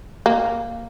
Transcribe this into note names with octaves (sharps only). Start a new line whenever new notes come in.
A#3